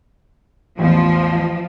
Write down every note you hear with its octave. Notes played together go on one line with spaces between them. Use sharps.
A1 E2 F3